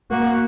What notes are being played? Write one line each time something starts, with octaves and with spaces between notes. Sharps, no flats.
A#3 F#4